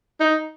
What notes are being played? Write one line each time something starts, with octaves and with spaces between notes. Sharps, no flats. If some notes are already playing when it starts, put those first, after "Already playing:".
D#4